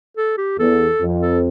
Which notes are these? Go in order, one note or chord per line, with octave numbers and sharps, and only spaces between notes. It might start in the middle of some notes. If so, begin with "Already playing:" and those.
A4
G4
E2 A4
F2
A4